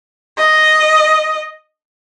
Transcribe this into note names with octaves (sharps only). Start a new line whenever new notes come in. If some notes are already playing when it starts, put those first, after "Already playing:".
D#5